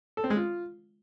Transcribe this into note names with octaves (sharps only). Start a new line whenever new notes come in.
A4
C4
G#3
F4